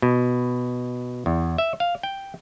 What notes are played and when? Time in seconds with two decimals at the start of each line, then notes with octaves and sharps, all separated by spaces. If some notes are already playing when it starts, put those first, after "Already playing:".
0.02 B2
1.26 E2
1.58 E5
1.80 F5
2.03 G5